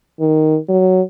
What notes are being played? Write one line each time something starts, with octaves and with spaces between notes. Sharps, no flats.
D#3
F#3